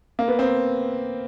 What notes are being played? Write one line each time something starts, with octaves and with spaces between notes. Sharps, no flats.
A#3
B3
C4